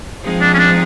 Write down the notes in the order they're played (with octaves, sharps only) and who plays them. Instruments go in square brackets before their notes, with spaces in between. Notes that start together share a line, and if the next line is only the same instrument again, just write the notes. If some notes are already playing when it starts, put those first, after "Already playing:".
[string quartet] F3 G#3 C4 D#4
[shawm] D4
C#4
D4